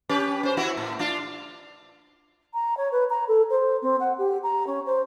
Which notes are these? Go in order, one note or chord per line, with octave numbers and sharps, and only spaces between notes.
C#4 G4 B4
C#4 C5
B3 E4 F#4
A2
D4 F4
A#5
C#5
B4
A#5
A4
C5
C4
F#5
G4
A#5
C#4
C5